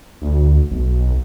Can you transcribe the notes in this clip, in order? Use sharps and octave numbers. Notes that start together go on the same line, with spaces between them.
D2
B1